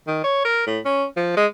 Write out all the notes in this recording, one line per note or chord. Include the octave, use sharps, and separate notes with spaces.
D#3
C#5
A#4
A2
C#4
F3
G#3